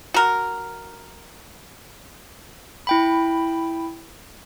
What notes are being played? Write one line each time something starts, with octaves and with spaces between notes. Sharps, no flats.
F#4 A#4
E4 G5 B5